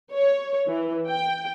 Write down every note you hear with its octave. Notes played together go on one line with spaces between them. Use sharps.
C#5
E3
G5